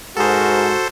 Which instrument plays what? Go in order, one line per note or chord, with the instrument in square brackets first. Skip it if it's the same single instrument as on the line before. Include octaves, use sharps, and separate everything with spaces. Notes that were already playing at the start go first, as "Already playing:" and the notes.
[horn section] G#2 G#3 A#4 [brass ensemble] F#4 [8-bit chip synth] A4 C5